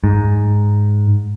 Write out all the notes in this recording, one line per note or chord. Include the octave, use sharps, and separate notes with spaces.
G#2